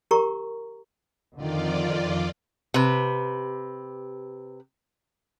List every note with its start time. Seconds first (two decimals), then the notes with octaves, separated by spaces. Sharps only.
0.11 G4 A#4 A#5 C#6
1.36 F2 D3 D#3 F4 D5
2.74 C3 B4